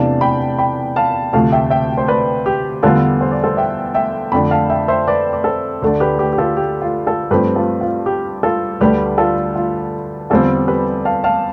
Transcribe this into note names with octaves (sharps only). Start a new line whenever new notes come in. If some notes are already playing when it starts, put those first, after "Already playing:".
Already playing: E2 C3 E3 A3 D4 F5 A5
G5 B5
G5 B5
F5 A5
D2 C3 F3 A3 F5 A5
E5 G5
E5 G5
C5
B4 D5
G4
E2 D3 G3 B3 F4 A4
C5
D5
A4 C5
E5 G5
E5 G5
F2 D3 A3 D4 G5 B5
F5 A5
E5 G5
C5 E5
B4 D5
D5
A4 C5
D2 D3 A3 D4
G4 B4
G4
G4
F4 A4
G4
F4
F4 A4
G2 F3 A3 C4 G4 B4
F4 A4
F4
G4
F4 A4
D2 D3 G3 D4 G4 B4
F4 A4
F4
E2 D3 G3 C4 F4 A4
G4 B4
F5 A5
F5 A5